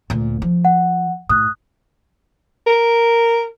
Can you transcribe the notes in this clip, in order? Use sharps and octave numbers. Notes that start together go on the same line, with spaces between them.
D2 A#2
F3
F#5
A2 D#6 F#6
A#4